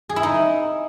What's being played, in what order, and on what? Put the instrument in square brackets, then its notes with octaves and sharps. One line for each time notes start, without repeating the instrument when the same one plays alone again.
[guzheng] G#4
E4
D#4